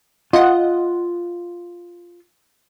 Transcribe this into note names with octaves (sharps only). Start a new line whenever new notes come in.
F4 D#5 F#5